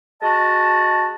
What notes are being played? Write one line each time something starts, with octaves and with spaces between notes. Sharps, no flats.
G#3 F#4 D#5 A5